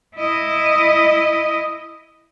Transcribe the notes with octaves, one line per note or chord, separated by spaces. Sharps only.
E4 D#5